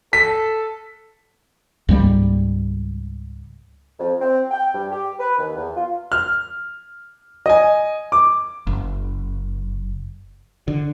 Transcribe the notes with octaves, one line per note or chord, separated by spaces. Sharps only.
A4 B6
C#2 G#2 G3 A#3
F2
C4
G5
G2
G4
B4
D#2
E2
F4
F6
D#5 G#5
D6
F#1
D3